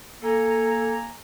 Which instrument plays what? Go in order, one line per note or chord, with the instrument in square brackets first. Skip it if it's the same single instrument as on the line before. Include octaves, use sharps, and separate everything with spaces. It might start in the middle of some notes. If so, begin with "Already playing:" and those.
[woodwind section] A#3 G#5 A#5 [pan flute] A4